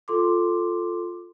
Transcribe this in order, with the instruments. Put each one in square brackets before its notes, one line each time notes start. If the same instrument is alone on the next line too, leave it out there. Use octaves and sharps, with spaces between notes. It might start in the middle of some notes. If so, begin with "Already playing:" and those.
[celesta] F4 A4 C6 D6